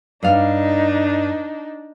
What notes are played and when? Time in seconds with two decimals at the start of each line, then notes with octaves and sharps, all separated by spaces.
0.23 G2 D4 D#4 D5 F5